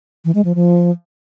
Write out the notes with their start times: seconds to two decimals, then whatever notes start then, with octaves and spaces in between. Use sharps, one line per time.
0.25 E3
0.35 G#3
0.45 F3
0.55 F3